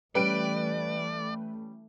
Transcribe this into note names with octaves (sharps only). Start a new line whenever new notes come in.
E3 G3 A3 C#4 B4 D5 G5 D7